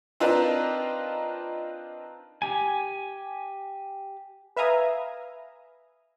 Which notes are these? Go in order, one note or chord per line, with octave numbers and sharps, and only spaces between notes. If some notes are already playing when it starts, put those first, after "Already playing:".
C4 D4 D#4 F4 A#4 B4
G4 G#5
B4 E5 F5 G#5 A#5 D#6